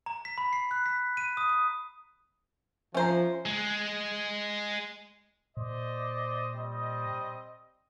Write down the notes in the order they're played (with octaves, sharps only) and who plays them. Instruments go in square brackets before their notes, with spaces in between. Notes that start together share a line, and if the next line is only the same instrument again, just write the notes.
[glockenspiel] A#5
B6
B5
C7
F#6
B6
D#7
D#6
D#6
[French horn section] F3 [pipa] C#4 C5 [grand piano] E5 G#5 A#5
[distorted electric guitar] G#3
[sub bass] A#2 [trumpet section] C5 D5 D#5
[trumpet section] G3 C4 D#5